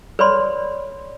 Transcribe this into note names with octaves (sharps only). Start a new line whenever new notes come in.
B4 C#5 D5 B5 C6